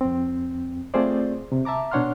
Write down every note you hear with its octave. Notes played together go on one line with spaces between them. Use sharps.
F2 C4
A3 C4 F4 G#4 C5 D5
C3
E5 A5 A#5 D6
B2 D4 C#5 F#5 C6 F6